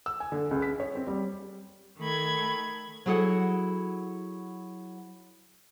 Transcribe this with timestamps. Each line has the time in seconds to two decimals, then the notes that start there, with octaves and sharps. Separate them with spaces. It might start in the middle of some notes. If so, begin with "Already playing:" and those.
0.06 E6
0.20 G#5
0.32 D3
0.51 C#2
0.62 B6
0.80 C#5
0.95 C4
1.07 G3
1.99 D#3 A3 B5 G#6
3.06 F#3 E4 G#4 A4 F#5